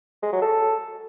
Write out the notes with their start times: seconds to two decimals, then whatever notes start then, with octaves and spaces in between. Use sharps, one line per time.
0.23 G#3
0.32 F#3
0.42 A4